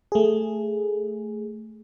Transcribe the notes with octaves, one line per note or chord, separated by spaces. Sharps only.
A3 G#4